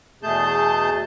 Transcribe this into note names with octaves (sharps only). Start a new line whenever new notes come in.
E2 B2 A3 G#4 A5 G6